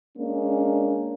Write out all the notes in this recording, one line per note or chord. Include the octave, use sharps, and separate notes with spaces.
G#3 A#3 C#4 D4